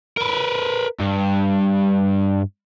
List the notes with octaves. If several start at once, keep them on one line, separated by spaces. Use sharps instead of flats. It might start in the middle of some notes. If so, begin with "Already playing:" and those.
A#4 B4
G2